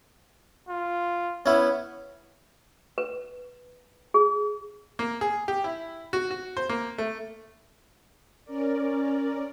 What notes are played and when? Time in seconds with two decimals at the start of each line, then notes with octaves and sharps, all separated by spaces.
0.68 F4
1.46 B3 C#4 E4
2.98 B4
4.14 G#4
4.99 A#3
5.21 G#4
5.48 G4
5.64 E4
6.13 F#4
6.31 F#4
6.57 C5
6.69 A#3
6.98 A3
8.44 C#4 A#4 D5